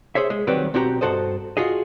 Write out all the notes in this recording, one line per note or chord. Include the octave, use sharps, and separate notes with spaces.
G#4 C5 C#5 E5
G#3
D#3 F#3 G3 C4 G4 B4
B1 C4 E4 F#4 G4 A#5
G2 D3 F#4 A4 C5 D#5
F4 F#4 G#4 D#5